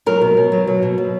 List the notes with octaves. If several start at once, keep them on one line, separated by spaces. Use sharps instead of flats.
F#3 A#4
B2
B2
F#3
F#3
B2
B2